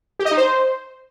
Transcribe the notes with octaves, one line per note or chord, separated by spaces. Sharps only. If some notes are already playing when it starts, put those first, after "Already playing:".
G4
D#5
D#4
C5